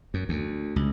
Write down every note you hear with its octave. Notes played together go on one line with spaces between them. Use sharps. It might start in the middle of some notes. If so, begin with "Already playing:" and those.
F#2
D2
C#2